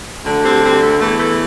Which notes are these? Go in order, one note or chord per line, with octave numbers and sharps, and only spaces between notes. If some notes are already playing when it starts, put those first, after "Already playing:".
D2 D3
G3 C4
G3 C4
A3
E2 E3 A3
A3